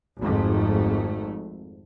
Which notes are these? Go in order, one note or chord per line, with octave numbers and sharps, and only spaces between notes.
G#1 F2 G#2 A3